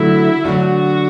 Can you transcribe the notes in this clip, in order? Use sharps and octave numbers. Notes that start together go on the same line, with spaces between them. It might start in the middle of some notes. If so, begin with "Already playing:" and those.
Already playing: D3 F#3 A3 E4
D3 F#3 A3 D4 F#4